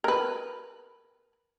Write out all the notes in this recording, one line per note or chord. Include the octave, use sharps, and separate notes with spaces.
A#4 B4